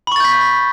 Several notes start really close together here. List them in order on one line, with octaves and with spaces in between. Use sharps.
B5 C#6 A6 G6 B6